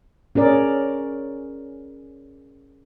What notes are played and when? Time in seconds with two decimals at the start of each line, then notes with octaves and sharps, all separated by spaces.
0.35 C#4 G#4 A#4 D5